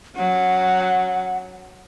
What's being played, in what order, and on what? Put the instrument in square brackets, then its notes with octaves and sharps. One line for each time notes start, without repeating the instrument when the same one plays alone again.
[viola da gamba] F#3 C#4 [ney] F#5